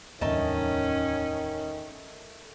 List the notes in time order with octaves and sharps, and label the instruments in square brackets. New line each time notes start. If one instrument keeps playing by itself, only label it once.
[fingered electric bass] D1 E2 G2 [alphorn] D#3 [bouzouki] A3 D#4 A5 [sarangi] C#4